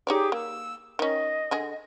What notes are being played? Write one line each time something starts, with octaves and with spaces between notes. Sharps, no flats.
D#4 G4 G#4 C#5 D5 D6
A#3 E6
D#3 C#4 D#5
D3 G#4 G#5